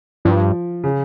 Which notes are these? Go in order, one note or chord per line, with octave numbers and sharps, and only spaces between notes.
G2 F3
C#3